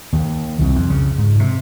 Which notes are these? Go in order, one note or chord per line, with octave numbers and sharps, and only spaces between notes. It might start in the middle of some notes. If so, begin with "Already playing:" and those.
D#2
C2
F2
C#3
G#2
C3